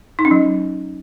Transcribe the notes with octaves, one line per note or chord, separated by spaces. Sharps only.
D#4
C#4
F#3